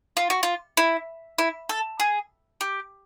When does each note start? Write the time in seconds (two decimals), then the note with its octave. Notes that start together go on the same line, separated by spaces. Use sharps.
0.17 F4
0.30 F#4
0.43 F4
0.77 E4
1.38 E4
1.69 A4
2.00 G#4
2.61 G4